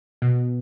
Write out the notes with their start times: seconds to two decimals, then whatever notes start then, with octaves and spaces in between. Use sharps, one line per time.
0.22 B2